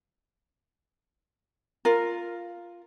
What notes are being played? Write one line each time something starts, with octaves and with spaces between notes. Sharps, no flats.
F4 A#4